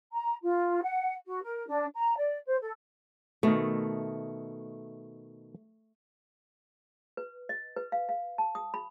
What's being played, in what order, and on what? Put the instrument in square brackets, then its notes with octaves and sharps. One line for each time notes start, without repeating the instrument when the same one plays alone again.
[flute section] A#5
F4
F#5
F#4
A#4
D4
A#5
D5
C5
A4
[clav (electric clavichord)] B2 D#3 [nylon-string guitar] A3
[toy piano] B4
D#5
B4
F5
F5
A5
D#6
B5